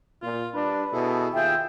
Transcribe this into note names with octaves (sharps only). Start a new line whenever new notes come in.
A#2 F4
G3 D4 B4
B2 E4 G#4 A4
D#2 F4 G#4 E5 G5